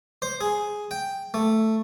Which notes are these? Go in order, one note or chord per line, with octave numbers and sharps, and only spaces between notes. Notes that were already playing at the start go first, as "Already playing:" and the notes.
C5
G#4
G5
A3